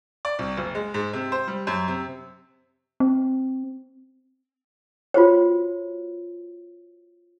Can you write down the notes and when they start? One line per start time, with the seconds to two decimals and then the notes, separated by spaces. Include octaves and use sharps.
0.25 D5
0.39 C2
0.57 F#1
0.75 G#3
0.94 G#2
1.13 C3
1.32 C5
1.48 G3
1.67 F#2
1.88 C3
3.00 C4
5.14 F4 F#4 C5 C#5